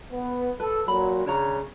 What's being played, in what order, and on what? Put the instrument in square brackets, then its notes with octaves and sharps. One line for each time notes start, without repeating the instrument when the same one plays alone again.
[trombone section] B3
[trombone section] A4 [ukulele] B4
[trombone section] A#2 F#3 [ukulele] B5
[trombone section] C#3 [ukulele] D4 C#5 A#5